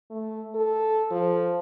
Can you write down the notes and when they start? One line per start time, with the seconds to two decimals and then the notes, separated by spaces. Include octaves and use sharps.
0.10 A3
0.55 A4
1.11 F3